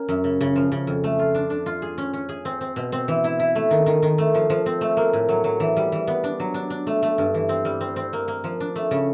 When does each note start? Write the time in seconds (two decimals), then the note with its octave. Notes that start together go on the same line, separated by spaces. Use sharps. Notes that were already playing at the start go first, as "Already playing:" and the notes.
Already playing: A#3 C#4
0.09 F#2
0.24 C#3
0.41 C#3
0.56 F3
0.72 C#3
0.87 F2
1.04 A3
1.19 F4
1.35 D4
1.50 D4
1.66 F4
1.82 G#4
1.98 C#4
2.13 C#4
2.29 G#4
2.45 C4
2.61 C4
2.76 B2
2.92 C4
3.08 E3
3.24 E4
3.40 E4
3.55 A3
3.71 D#3
3.86 D#3
4.03 D#3
4.18 A3
4.35 F3
4.50 F3
4.66 C4
4.81 A3
4.97 A#3
5.13 A2
5.29 F#3
5.44 F#3
5.60 E3
5.77 G3
5.92 E3
6.08 B3
6.24 D4
6.40 F#3
6.54 D4
6.70 D4
6.87 A3
7.02 A3
7.18 G2
7.34 E3
7.49 C4
7.65 G3
7.81 C4
7.96 C4
8.13 A#3
8.28 A#3
8.44 F3
8.60 D4
8.76 A3
8.91 C#3